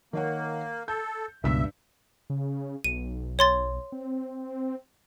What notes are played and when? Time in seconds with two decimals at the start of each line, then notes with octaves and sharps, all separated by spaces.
0.13 D#3 A#3 C#5 F#5
0.88 A4 G6
1.44 C#2 G2 B2 E5 E6 B6
2.30 C#3
2.84 B1 D#7
3.39 C#5 C6 A6
3.92 C4